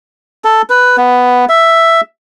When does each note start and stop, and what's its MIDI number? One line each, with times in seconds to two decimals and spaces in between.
0.44 0.62 69
0.70 0.96 71
0.97 1.45 59
1.49 2.01 76